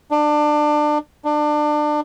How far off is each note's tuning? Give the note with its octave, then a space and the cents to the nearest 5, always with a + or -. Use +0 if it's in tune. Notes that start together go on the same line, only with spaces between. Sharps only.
D4 +25
D4 +25